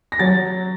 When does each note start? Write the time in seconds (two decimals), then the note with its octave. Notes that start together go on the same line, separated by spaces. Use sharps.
0.12 A#6
0.19 F#3 A6